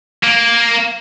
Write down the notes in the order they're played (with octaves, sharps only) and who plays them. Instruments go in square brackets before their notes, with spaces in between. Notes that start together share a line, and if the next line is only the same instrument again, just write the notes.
[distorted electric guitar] A#3